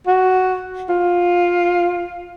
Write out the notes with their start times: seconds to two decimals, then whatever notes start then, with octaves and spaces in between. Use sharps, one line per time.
0.07 F#4
0.89 F4